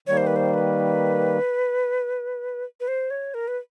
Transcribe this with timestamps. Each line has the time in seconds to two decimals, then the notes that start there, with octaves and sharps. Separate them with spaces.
0.07 D#3 G3 A#3 C#5
0.17 C5
0.27 B4
0.36 C5
0.54 B4
2.80 B4
2.88 C5
3.10 C#5
3.34 A#4
3.48 B4